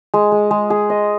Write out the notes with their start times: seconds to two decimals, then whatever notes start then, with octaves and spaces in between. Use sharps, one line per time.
0.14 G#3
0.32 G#3
0.51 G#3
0.70 G#4
0.90 D#5